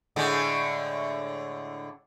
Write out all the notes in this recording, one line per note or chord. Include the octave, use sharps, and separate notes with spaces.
A2 D3 G#3